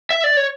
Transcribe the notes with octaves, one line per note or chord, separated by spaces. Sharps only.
E5
D5
C#5